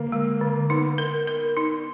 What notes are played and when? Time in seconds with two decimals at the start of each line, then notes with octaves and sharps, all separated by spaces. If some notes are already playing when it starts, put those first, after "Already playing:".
Already playing: D3 A#3
0.12 G#3
0.41 D3
0.70 B3 D#4
0.98 A#4
1.28 A#4
1.57 D#4